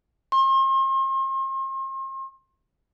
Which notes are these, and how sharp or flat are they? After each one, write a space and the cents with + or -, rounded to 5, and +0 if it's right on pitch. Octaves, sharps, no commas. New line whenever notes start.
C6 +40